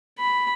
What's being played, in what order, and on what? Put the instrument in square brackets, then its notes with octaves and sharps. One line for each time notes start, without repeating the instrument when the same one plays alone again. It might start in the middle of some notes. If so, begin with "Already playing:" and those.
[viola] B5